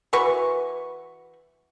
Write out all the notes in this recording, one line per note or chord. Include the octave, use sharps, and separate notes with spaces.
E3 F#4 B4 C#6